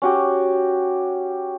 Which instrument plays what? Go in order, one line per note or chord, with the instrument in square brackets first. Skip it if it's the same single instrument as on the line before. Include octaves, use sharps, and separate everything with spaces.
[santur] C#4 F#4 G4